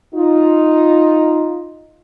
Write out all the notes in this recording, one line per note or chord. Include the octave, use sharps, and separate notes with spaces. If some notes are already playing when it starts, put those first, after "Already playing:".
D#4 F4